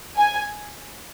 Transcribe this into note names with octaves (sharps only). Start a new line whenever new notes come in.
G#5